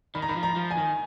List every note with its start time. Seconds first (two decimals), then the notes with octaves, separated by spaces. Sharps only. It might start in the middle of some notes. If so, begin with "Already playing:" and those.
0.15 D#3 B5
0.22 A#5
0.29 D#3 B5
0.36 F3
0.43 A#5
0.56 F3
0.71 G#5
0.77 D#3